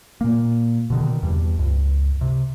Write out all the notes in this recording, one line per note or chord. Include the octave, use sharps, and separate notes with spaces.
A#2 A#3
B2 D3 D#3
E2 G2
C#2 G2
C3